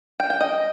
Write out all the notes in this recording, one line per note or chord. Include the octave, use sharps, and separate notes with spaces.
G5
G5
D#5